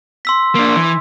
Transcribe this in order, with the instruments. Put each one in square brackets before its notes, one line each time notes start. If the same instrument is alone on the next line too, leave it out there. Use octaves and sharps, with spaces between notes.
[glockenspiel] C6 E6 B6
[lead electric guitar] A#3 D4
E3